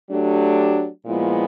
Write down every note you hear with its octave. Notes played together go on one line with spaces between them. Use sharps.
F#3 A3 D4 G4
A#2 F3 G#3 B3 E4